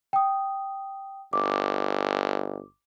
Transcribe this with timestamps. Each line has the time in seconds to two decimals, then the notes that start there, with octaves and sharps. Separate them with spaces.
0.13 G5 D#6
1.33 G1 D6